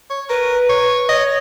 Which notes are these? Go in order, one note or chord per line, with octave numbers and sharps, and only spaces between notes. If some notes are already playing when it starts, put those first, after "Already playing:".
C#5
A#4 B4
C#5
C#5 D#5